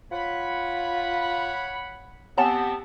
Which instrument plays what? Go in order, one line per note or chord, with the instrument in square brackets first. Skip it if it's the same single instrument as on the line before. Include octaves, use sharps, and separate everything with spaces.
[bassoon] F4 [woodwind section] C#5 F#5 B5
[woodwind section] B3 C4 [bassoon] G4 [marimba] C#5 F#5 G#5 [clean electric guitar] A5